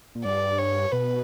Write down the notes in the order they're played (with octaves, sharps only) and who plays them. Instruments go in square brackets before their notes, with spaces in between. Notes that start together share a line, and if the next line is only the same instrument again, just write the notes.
[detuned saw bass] A#2
[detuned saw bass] G2 [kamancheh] D5
[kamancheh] C#5
[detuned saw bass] B2 [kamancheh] B4